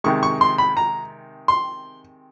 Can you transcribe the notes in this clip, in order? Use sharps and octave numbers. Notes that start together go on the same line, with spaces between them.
C3 D#3 G#3 C#6
C#6
C6
B5
A#5
C6